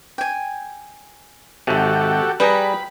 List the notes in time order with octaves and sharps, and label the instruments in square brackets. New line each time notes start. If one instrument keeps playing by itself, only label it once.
[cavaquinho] G5 G#5
[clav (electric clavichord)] G#1 C3 [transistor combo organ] F#4 G4 A4
[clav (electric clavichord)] G3 G#4 A#5 [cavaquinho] B4 G5 [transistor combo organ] B5